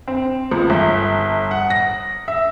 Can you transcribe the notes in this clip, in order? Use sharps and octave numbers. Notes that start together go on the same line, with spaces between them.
C4
C#2
G1
F#5
A#6
E5